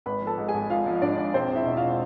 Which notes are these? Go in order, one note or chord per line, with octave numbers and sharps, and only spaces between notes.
G#1 B4 B5
F3
A4 A5
G#2
G#4 G#5
G#1
G#1 F4 F5
F3
G#1 D4 D5
G#1
E1 C4 C5
E1
E4 E5
B2
F4 F5
B2